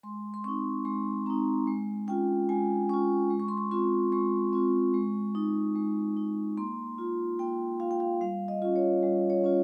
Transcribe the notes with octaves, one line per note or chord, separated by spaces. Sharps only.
G#3 C6
C6
C4 D#4 C#6
G#3 C6
C4 D#4 A#5
G#3
C#4 F4 G5
G#3 G#5
C#4 F4 C#6
G#3
C#6
C6
C#6
C4 F4 C6
G#3 C#6
C4 F4
G#3
D#4
G#3
D#4
A#3 C6
F4
A#3 G5
F4 F5
G5
F5
G3 F5
D#5
C#4 F4
C#5
G3
C#5
C#4 F4